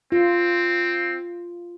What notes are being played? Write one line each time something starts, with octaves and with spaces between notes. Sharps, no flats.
C4 F4